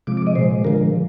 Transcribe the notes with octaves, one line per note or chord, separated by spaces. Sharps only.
C3 F3 G#3 D6
D6
D#5
A#2 G#3 C5
D3 F3 G#3 A#4